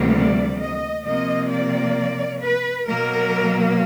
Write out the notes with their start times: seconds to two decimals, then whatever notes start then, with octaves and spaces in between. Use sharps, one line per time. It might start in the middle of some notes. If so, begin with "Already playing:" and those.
Already playing: D2 C3 E3 G3 A#3
0.13 D5
0.59 D#5
1.04 C3 F3 A#3 D#5
1.50 D5
2.42 B4
2.87 B2 F#3 A#3 A#4